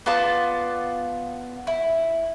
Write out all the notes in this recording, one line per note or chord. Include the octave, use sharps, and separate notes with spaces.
B3 F4 D5 A5
E4